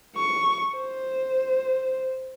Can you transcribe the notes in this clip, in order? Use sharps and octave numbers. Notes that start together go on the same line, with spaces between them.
C#6
C5